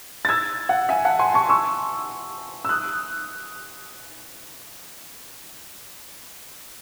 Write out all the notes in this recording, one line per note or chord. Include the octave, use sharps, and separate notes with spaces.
A6
E6 G#6
F#5
E5 G#5
F#5 A5
G#5 C6
A5 C#6
C#6 E6
E6
D#6 F#6